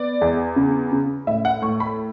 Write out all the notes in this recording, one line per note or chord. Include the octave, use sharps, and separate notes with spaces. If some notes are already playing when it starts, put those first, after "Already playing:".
Already playing: B3 D5
E2
C#3
C#3
A2 E5
F#5
A2 C#6
B5